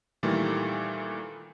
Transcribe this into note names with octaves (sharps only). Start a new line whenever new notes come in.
A#2 D#3 E3 G3 A3